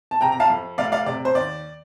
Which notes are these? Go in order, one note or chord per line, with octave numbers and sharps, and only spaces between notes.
A5
C3 G5 A#5
A#5
F5 A5
F2
F1 D5 F5
D5 F5
C3 D5
C5
D#2 D5